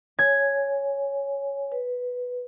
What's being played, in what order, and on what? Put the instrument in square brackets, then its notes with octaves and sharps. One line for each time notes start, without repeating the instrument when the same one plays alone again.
[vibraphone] C#5 G#5 [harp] G#6
[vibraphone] B4